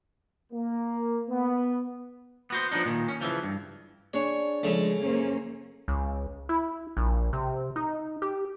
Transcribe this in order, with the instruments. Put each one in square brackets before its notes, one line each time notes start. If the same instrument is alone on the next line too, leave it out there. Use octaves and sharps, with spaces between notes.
[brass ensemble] A#3
B3
[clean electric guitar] B3 F#4 C5
F3 B3 D4 D#4
A#2 D#3
C#4
C#3 E3 F3
G2
[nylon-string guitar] D4 G#4 D5 [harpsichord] C#5
[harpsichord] C#3 A3 [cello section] F3 G#3
[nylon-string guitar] F#2 C5 [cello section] A#3 C#4
[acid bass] C#2
E4
A#1
C3
D#4
G4